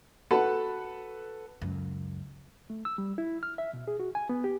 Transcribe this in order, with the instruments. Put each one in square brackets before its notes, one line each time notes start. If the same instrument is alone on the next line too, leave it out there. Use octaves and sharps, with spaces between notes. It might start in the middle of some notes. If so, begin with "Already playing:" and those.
[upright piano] F#4 A4 B4 F#5 A5 B5
[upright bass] C#2 F#2
[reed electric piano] A3
E6
G3
E4
F6
E5
B2
G#4
F#4
G#5
B3
G4